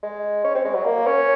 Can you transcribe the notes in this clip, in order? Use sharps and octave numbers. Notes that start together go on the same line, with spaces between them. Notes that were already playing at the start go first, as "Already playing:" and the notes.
G#3
C#4
C4
G#3
F#3
A#3
C#4